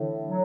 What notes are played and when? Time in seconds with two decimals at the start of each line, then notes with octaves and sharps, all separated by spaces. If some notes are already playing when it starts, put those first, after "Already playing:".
Already playing: A2 D3 E3
0.28 F#3